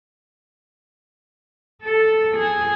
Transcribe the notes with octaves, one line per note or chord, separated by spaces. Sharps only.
A4
G#4